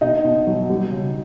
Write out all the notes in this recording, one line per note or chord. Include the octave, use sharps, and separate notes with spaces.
B2 D#4 D#5
B2
F#3
G3
C#3